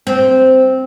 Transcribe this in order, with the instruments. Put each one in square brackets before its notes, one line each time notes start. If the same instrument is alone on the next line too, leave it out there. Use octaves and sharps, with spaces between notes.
[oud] C4